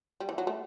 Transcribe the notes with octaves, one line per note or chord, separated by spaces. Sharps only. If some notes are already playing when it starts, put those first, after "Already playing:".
G3
E3
F#3
A3